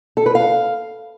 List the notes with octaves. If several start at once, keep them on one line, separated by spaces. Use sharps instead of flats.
A4
B4
F5